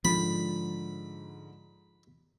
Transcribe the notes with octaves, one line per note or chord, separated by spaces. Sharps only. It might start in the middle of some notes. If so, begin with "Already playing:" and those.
G#2 D3 F3 B5